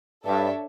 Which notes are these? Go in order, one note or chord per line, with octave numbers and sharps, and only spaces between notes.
G2 D4 A4 C#5 E5